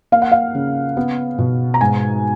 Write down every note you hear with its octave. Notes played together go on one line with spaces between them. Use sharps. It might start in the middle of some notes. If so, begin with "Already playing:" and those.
A#3 F5
F#5
F5
C#3
B3
B2
A#5
G#2 G#5